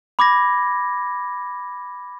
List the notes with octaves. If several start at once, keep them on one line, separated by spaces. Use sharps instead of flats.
B5 D6 G#6 A#6